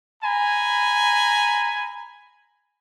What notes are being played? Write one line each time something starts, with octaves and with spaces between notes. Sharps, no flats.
G#5 A#5 B5